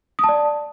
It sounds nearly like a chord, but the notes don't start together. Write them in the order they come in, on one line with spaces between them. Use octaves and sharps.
D#6 A5 D5